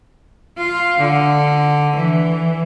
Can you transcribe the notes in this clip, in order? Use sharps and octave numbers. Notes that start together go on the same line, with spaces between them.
F4
D3
E3